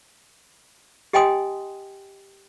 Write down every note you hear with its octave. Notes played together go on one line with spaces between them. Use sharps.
G4 D#5 G5 G#5 C6 D#6